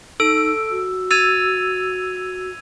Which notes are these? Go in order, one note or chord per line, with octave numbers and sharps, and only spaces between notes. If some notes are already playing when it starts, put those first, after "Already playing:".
D#4 A4 E6 D7
F#4
E6 G#6 A6 D#7 F7